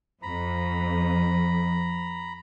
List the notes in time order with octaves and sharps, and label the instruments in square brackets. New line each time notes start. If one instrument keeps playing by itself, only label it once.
[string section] F2 [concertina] A#5 B5